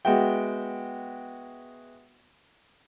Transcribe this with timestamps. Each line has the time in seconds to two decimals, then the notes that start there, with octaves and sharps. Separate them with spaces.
0.05 G#3 B3 F#4 E5 G5